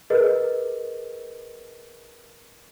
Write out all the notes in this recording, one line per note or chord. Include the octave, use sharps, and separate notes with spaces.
G#4 A#4 B4 D#5